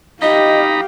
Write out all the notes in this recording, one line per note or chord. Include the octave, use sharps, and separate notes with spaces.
D#4 G4 D#5 F5 A#5 B5